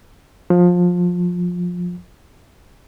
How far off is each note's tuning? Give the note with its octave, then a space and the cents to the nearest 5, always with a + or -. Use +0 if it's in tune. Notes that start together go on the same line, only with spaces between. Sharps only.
F3 +20